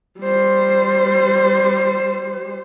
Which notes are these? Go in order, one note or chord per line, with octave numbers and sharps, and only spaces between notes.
G3 C5